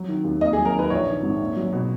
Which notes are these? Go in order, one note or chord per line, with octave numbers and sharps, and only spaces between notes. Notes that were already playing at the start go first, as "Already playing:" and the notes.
Already playing: F#3
D#3
D#2
A#3 D#5
G#4
F#3
A#4
D#3 B4
A#1 C#5
D#3
G#2
A#3
F#3
B2